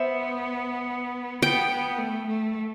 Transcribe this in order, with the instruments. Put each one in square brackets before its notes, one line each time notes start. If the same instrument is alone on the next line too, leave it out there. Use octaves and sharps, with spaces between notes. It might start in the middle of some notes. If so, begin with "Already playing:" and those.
Already playing: [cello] B3 [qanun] A4 C5 E5
[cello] B3 [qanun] G5
[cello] B3
A3
A3